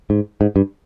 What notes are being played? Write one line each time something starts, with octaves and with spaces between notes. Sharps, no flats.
G#2
G#2
G2